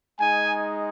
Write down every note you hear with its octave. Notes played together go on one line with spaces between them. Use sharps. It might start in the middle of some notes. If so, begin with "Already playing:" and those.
G#3 D#4 G#5